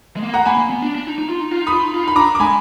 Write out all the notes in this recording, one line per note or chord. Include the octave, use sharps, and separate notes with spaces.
G#3
A#3
F#5 A#5
A#3 G#5 B5
A#3
B3
D4
D4
D#4
D#4
F4
D#4
F4
D#4
B5 D#6
F4
D#4
F4
D#4 B5
D4 A#5 D6
D6
G#3 G#5 B5